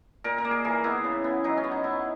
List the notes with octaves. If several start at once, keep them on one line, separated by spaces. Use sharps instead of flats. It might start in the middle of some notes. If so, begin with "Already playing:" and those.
A#2 A#4
A#4
A#3
G#4
E3 G#4
B3 E4
C#3
B3
F#3 D#4
C#4
B3
D#4
B3 E4